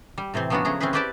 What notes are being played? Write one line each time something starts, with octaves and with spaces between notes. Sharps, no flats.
G3
A2 C3 E3 C4
F3 F#3 B3 C#4 D4 F#4
C#3 A3 G#4 A#5
C4 C#4 E4 G#4 B4
C4 G4 B4 D5 G5 A5